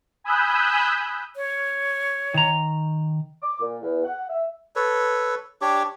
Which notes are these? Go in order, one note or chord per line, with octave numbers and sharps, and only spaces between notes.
G#5 B5 D#6 E6 F#6 G6
C#5
D#3 A#5
D6
A#2
E2
F#5
E5
A4 B4 C#5
D4 G4 C#5 D6